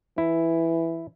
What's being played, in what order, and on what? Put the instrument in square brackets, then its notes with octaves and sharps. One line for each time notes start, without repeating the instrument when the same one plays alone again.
[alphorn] E3 [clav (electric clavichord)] E4